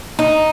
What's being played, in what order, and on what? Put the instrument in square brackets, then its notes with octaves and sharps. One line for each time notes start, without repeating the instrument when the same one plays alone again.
[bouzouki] D#4